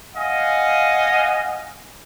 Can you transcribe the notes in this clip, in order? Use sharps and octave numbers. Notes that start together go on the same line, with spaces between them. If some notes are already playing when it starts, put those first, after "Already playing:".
D#5 F5 F#5 G#5